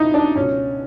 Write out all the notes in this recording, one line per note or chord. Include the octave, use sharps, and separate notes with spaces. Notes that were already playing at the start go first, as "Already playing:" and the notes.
Already playing: C#2 B2 D#4 E4
D4
C#2 B2 C#4